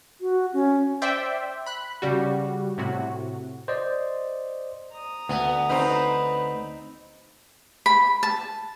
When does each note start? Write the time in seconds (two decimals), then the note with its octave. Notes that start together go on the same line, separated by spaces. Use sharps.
0.21 F#4
0.53 C#4
1.02 C5 D5 E5 G5
1.66 B5 F#6
2.02 C#3 G3 F#4
2.78 A2 C3 F#4
3.68 C5 D5 D#5
4.92 A#5 D#6
5.29 D2 B3
5.69 C4 D#4 B4
7.86 B5
8.23 A5